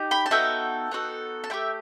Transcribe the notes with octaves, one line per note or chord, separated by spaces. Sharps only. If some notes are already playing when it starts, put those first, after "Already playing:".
Already playing: D#4 G4
G5 B5
A5
B3 D#4 F#4 A4 E5 G5
B3 D#4 F#4 A4
A5
A3 E4 G4 E5 G5